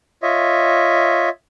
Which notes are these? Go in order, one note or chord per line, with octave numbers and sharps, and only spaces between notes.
F4 C#5 D#5 E5